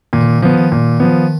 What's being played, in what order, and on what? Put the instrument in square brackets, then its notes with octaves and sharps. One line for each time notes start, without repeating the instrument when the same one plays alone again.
[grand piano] A#2 [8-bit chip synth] D#3
[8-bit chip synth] D3
D#3
[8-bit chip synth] D3 [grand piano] F3 B3
[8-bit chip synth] D#3
[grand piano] A#2
F3 B3